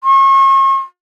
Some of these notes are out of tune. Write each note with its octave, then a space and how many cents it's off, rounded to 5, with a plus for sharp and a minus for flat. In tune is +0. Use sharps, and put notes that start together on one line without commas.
C#6 -40